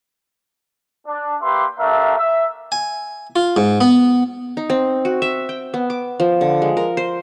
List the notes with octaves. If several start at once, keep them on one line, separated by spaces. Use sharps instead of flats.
D4
A#3 G4 B4 E5 C6
A3 D4 G4 A#4 E5 F5
E5
G#5
F4
G#2
B3
D#4
C4
F#4
E5
G5
B3
D6
F3
D3
G#3
A#4
C5